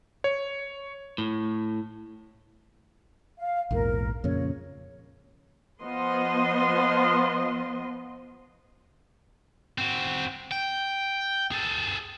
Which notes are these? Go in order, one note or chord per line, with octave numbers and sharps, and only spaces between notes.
C#5
A2
F5
A#1 E2 G#2 A#4
F2 A#2 C#3 C#5
F3 B3 D#5 C6
C4 F#4
G5
G#4 A4